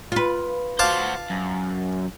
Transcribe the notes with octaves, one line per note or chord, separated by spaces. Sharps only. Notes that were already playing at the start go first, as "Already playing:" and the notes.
F4 B4
F#4 C5 F5 A5 D6
F#2